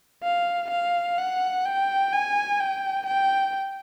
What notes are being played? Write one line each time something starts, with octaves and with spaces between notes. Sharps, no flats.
F5
F5
F#5
G5
G#5
G5
G5